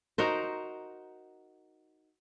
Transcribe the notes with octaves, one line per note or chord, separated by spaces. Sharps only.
D#4 F#4 A#4 C5